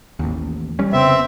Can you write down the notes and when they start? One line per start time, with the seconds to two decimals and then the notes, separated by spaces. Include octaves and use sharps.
0.19 A1 D#2
0.79 G3 C#4
0.93 F1 C#3 B3 C4 E5